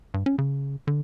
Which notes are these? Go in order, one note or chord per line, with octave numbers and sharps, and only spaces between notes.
G2
C#4
C#3
D3